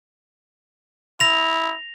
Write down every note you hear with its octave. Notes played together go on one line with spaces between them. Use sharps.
E4 A#6 F7